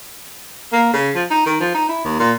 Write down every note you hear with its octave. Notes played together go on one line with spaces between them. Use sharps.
A#3
C#3
F3
D#4
D#3
F3
D#4
E4
D#2
A#2